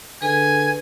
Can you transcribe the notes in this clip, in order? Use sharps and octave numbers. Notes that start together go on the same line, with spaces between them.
D3 G#4 B4 G#5